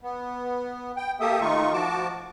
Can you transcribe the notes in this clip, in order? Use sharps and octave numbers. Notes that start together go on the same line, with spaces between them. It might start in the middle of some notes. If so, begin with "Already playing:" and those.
B3
G5
A#3 G4 A4 E5 D#6
D#3 A3 D#4 F4 C#6
F3 F#4 A5 D6